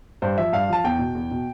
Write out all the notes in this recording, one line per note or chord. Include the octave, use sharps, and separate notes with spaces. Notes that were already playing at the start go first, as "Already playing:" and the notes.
G2 C5
F3 E5
G2 F5
F3 A5
E2 G5
B2
E2
B2